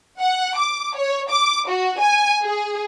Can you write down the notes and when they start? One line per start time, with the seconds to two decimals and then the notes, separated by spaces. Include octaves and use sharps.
0.20 F#5
0.58 D6
0.97 C#5
1.30 D6
1.69 F#4
1.99 G#5
2.42 G#4